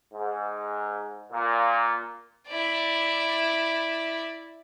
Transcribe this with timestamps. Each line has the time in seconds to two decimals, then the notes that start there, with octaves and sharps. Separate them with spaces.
0.14 G#2
1.32 A#2
2.49 E4 D5